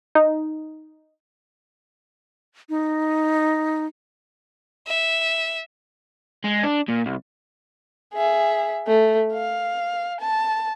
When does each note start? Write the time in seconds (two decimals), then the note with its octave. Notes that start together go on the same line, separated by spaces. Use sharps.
0.15 D#4
2.69 D#4
4.88 E5
6.44 G#3
6.63 D4
6.89 A#2
7.06 C2
8.14 G#4 E5
8.87 A3
9.33 F5
10.21 A5